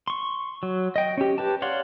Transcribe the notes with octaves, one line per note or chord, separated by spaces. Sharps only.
C6 C#6
F#3
D#5 G5
C#4 G4
G4 B4 A5
C#5 D5 F5 F#5 C6